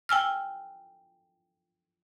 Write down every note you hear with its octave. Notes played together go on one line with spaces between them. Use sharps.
G5 G#5 E6 F6